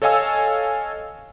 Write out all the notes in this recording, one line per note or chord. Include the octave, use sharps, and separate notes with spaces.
A4 C#5 D#5 F5 G#5 E6